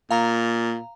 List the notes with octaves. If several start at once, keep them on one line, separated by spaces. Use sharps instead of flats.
A#2 F5 A#5